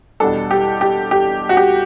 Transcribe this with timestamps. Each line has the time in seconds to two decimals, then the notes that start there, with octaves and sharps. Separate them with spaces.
0.20 E2 B2 G3 D4 A4
0.51 G4
0.81 G4
1.11 G4
1.49 F#4
1.57 G4